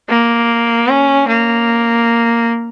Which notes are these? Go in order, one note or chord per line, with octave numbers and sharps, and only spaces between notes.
A#3
C#4
A#3